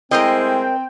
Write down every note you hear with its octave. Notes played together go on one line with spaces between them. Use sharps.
G#3 A3 C4 E4 A#4 C5 D#5 G5